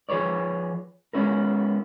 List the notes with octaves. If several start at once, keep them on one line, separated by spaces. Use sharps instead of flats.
F3 G#4 B4 C#5 D5
G#3 B3 C#4 E4 A#4